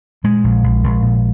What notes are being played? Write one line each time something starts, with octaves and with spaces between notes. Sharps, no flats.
A#2 G#3
A#1
A#1
A#1
A#2